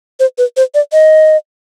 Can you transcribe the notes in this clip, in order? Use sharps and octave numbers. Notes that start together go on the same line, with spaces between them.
C5
B4
C5
D5
D#5